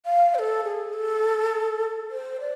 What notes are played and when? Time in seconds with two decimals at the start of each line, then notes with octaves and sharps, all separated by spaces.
0.06 F5
0.35 C5
0.39 A4
0.64 G#4
0.93 A4
2.10 C5
2.40 D5